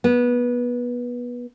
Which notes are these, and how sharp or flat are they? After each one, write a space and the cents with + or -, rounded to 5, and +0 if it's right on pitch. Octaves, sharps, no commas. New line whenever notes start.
B3 -20